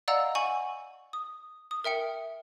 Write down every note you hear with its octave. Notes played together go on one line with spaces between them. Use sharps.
D5 D#5 F5 F#5 A#5 E6
F#5 G#5 C#6 F#7
D#6
D#6
A#4 E5 G5 C#7